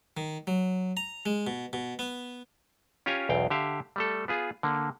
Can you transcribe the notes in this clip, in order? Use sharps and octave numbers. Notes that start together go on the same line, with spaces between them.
D#3
F#3
A#5
G#3
B2
B2
B3
C#4 F4 G4 C#5 G#5 A#5
B1 E2 F5 G5
D3 G4 E5 F5
G3 A3 A4
B3 F4 G#4
D3 A#3